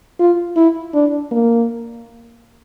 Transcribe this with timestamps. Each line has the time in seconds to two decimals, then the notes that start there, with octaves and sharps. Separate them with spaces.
0.19 F4
0.56 E4
0.94 D4
1.31 A#3